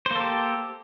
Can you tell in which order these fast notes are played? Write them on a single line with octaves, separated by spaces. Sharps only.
C5 A#3 A4 G4